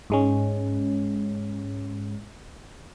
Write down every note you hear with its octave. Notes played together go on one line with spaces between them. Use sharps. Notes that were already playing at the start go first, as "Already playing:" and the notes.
G#2 G#3 C#4